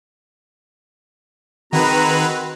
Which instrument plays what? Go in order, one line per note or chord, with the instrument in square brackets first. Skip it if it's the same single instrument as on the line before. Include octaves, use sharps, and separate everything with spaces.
[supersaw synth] D#3 B4 [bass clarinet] C4 [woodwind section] F#4 G#4 A#5